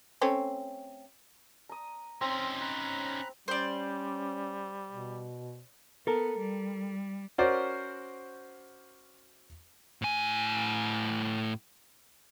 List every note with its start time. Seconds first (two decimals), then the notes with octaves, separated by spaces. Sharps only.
0.21 A3 C4 C#4
1.69 A#5 D#6
2.21 C4 C#4 D#4 C6
2.61 A#5 B5 F#6
3.48 G3 C#4 C5 D5
4.91 B2
6.07 B3 A4 A#4
6.38 G3
7.38 C#4 F#4 A#4 C5 D5
10.02 A2 G#5